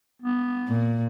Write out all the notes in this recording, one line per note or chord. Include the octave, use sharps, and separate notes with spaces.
B3
A#2